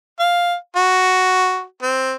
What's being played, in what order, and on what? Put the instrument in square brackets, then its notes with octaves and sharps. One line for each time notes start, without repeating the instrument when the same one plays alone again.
[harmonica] F5
F#4
C4